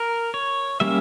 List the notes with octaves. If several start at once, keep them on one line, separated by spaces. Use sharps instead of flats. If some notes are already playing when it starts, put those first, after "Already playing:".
Already playing: A#4
C#5
G3 A#3 C#4 E5